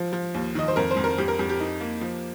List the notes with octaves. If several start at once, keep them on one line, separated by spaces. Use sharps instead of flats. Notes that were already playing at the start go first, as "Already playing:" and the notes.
Already playing: F3
F3
D#2
D#3 D#5
C5
F2 A#4
C5
F2
A#4
F2 G4
A#4
F2 G4
G4
D#4
A#3
F3